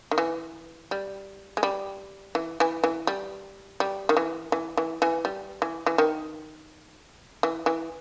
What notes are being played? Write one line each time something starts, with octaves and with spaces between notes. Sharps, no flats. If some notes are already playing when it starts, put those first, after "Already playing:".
D#3
E3
G3
G#3
G3
E3
E3
E3
G3
G3
D#3
E3
E3
E3
E3
G3
E3
E3
D#3
E3
E3